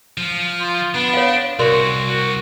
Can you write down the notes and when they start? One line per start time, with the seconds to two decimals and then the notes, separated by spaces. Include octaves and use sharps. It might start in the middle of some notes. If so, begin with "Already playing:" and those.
0.18 F3
0.61 F4
0.94 B3 D4
1.14 C#5 F5
1.59 C2 F#4 A#4 D5 C6
2.08 F#4